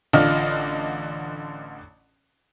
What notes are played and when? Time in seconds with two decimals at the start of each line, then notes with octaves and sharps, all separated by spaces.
0.13 A1 D3 F4 D5 D#5 F6